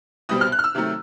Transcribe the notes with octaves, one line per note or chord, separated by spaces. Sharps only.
C2 B2 G3 C4 D#6
F6
F#6
F6
E6
C3 D#3 F#3 A3